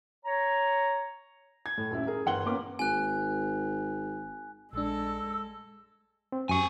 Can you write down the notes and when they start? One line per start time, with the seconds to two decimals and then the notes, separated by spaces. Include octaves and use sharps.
0.25 C#5 A#5
1.66 G#6
1.78 A2
1.91 D#1 F#2 E4
2.07 G#4 A#4
2.26 G1 E3 A#4 F#5 C6 G7
2.45 A#2 A#3 B3 C#4 A#4 D6
2.79 G#1 G#5 F#6
4.73 A#1 G#3 D4 A4 E6
6.32 C4
6.49 F#2 G4 G#5 C#6